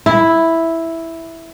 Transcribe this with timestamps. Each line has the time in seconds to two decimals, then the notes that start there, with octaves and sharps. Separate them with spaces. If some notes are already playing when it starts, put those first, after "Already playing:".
0.06 E4